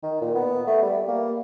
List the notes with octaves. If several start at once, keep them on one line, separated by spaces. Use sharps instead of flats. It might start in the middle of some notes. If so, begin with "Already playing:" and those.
D#3
A#2
B3
A3
G3
A#3